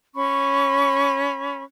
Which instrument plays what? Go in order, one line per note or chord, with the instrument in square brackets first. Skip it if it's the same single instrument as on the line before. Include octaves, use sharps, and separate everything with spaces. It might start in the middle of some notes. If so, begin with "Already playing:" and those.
[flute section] C#4 B5 C#6